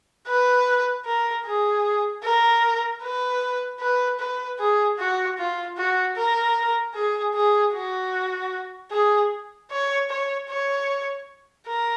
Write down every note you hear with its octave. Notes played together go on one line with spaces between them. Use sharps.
B4
A#4
G#4
A#4
B4
B4
B4
G#4
F#4
F4
F#4
A#4
G#4
G#4
F#4
G#4
C#5
C#5
C#5
A#4